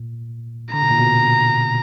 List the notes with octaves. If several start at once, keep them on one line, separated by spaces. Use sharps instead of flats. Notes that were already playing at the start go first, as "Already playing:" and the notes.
Already playing: A#2
D3 A#5
B2
A#2
B2